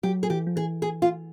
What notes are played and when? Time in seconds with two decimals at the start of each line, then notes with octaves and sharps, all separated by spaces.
0.03 F#3 G4
0.23 G#4
0.30 E3 G4
0.47 F3
0.56 E3 G#4
0.82 G#4
1.02 F4